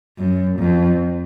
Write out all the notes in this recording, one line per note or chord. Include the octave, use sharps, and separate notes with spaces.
F#2
F2